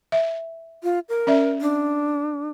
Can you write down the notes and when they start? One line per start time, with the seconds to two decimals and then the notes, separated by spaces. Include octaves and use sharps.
0.12 E5
0.83 F4
1.09 A#4
1.27 C#4 D5 E5
1.61 D4